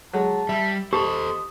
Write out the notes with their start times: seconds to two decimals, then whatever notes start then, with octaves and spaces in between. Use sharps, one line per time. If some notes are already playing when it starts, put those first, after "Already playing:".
0.13 F#3 G#3 A5
0.49 G3 E5
0.93 G4 A4 C5 D#5 A5